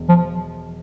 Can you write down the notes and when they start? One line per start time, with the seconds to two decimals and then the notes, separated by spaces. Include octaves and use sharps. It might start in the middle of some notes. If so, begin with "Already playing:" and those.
Already playing: E1
0.09 F3